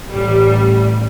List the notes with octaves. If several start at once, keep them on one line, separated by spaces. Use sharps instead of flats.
A1 G3